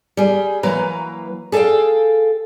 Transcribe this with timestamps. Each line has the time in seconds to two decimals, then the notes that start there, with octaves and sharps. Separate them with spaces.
0.17 G3 G#4
0.63 E3 F#3 A#3 B4 A#5
1.52 G#4 A4 E5 F5 G5